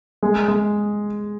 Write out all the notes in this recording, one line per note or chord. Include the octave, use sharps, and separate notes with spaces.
G#3
G#3